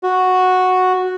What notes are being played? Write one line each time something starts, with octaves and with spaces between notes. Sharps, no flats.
F#4